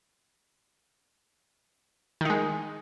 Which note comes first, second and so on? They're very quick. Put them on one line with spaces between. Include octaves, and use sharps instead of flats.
D#3 D#4 G#3